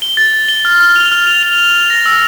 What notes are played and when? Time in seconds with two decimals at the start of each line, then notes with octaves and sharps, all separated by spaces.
0.02 G7
0.17 A6
0.33 A6
0.49 G7
0.65 F6
0.80 F6
0.96 F7
1.11 F6
1.27 F7
1.43 F7
1.58 F7
1.74 F7
1.90 A#6
2.06 E6